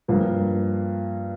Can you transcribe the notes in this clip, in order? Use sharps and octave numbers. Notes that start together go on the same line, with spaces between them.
G2 F3 A#3